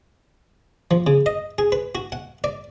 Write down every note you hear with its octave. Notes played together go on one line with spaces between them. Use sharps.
F3
C#3
D#5
G#4
B4
F#4
F#5
D5